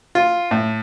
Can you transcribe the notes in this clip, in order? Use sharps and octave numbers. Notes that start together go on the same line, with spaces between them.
F4
A2